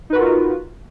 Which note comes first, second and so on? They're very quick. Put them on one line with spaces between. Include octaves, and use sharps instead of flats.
D#4 B4 F#4 A#4 F4